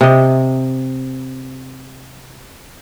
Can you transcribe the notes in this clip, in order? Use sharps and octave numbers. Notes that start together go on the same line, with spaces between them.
C3 D#5